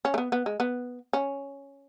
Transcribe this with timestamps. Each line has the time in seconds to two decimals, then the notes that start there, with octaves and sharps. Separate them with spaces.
0.05 C#4
0.14 A3
0.18 B3
0.32 B3
0.46 G#3
0.60 B3
1.13 C#4